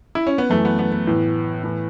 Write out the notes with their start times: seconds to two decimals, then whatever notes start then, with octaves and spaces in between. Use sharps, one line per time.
0.15 E4
0.27 C#4
0.38 B3
0.50 F#2 E3 A3
0.65 B3
0.79 B3
0.92 B3
1.07 A2 E3
1.64 A2 E3